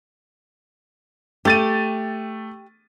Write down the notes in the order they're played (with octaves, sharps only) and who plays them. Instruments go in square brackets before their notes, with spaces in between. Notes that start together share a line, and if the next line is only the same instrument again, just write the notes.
[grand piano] A3 A6 D#7 [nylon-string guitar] G4